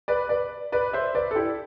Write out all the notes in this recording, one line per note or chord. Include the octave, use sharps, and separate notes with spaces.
B4 D5
B4 D5
B4 D5
C5 E5
B4 D5
A4
E4 G4